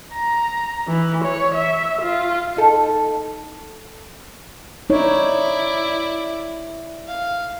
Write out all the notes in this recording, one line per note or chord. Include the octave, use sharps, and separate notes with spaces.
A#5
E3
C#5
E5
F4
D#4 A4
D#4 E4 C#5 D5
F5